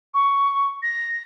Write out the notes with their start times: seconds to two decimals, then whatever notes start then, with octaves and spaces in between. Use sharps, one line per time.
0.14 C#6
0.83 A#6